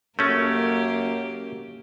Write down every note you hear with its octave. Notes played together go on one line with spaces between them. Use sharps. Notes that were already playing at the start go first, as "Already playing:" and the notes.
F#2 A3 A#3 C#4 G4